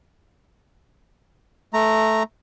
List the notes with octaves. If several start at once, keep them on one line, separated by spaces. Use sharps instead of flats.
A3 A#5